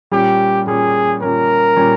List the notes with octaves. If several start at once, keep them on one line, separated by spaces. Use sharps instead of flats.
A#2 G3 C#4 G4
A#2 G3 C#4 G#4
A#2 G3 C#4 A#4
A#2 G3 C#4